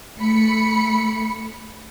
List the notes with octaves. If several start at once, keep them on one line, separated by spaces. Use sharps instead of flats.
A3 B5 C#7